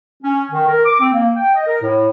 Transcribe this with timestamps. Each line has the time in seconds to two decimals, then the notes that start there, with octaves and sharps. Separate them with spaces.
0.23 C#4
0.51 D#3
0.67 A#4
0.84 D6
1.00 C4
1.13 A#3
1.36 G5
1.54 D#5
1.66 A#4
1.81 A2